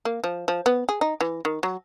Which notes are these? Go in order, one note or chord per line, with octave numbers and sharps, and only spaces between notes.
A#3
F3
F3
B3
G#4
D#4
E3
D#3
F#3